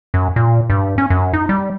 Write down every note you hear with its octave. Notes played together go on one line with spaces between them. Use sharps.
F#2
A#2
G2
C#4
F#2
D#4
G3